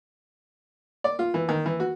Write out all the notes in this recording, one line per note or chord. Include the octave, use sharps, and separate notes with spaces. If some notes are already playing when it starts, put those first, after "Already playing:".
D5
F4
E3
D#3
E3
F#4